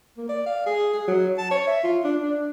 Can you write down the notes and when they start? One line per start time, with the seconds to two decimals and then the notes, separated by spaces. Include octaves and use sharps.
0.17 A#3
0.29 D5
0.46 F5
0.66 G#4
0.93 G#4
1.08 F#3
1.38 A5
1.51 C#5
1.67 E5
1.83 F4
2.04 D4
2.23 D4